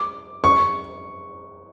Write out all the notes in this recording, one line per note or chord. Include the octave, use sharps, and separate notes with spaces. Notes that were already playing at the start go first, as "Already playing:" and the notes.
Already playing: D6
C#6